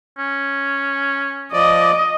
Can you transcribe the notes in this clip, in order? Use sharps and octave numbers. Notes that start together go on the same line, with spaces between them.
C#4
F3 D5 D#5 D6